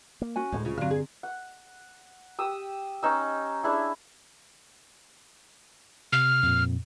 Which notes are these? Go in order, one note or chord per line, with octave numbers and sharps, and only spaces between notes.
A#3
C#4 F#4 G#5
D2 A2 G3 G#3
C#3 F4
G2 D3 F#3 C4 F5
G#4
F#5
G4 D#6 E6
C#4 D#4 E6
D4 E4 G#4
C3 F6
F2 A#2